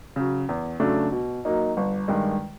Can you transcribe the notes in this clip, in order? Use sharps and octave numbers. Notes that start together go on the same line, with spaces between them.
C#3 F#3
E2
C#3 F#3 A3 D4
B2
F#3 A#3 D#4
G1
G2 D#3 G#3